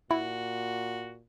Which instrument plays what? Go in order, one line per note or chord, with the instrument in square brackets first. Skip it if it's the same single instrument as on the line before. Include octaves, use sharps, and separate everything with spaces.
[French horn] A#2 [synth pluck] E4 [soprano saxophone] F#4